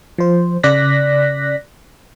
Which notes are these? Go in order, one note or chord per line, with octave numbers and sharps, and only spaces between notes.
F3 C5
C#3 D5 F#6 A#6 B6